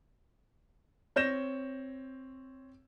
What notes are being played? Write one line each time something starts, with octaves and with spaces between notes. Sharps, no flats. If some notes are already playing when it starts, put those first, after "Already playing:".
C4 C#5 G6 A#6 E7